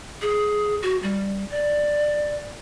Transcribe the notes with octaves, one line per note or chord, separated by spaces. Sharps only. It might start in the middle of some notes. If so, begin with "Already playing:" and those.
G#4
F#4
G3
D5